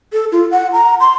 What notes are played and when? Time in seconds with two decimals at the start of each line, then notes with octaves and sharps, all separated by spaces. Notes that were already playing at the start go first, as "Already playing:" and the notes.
0.13 A4
0.32 F4
0.51 F#5
0.73 A#5
1.00 C6